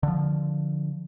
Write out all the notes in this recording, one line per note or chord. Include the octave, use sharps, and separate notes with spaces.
D3 F3